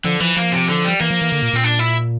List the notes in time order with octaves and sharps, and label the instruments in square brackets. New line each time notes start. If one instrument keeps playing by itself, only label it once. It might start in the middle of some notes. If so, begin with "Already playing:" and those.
[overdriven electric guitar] D3 [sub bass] F3
[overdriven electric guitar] E3 [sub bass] F3
[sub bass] F3 [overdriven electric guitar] A#3
[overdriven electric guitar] C3
D3
G3
[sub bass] E3 [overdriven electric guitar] A#3
[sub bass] F3
E3
D3
A#2
[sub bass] A#2 [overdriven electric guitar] C4
[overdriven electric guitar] D4
E4